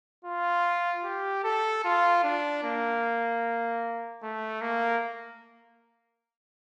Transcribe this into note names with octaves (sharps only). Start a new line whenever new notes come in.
F4
G4
A4
F4
D4
A#3
A3
A#3